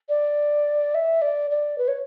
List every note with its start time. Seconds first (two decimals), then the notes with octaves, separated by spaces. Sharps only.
0.09 D5
0.95 E5
1.22 D5
1.51 D5
1.78 B4
1.88 C#5